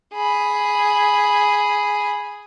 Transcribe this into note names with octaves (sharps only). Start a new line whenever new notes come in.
G#4 B5